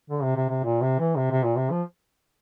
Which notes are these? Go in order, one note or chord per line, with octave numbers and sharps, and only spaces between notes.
D3
C3
C3
C3
A#2
C3
E3
C3
C3
A#2
C3
F3